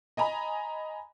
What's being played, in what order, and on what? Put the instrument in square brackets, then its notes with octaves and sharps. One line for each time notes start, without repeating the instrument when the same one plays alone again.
[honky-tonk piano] D#5 G#5 A#5 B5